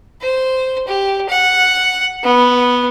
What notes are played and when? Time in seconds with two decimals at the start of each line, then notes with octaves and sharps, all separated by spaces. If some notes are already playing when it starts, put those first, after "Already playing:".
0.21 C5
0.87 G4
1.29 F#5
2.24 B3